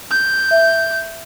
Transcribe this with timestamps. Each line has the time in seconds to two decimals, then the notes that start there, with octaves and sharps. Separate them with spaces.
0.11 G6
0.51 E5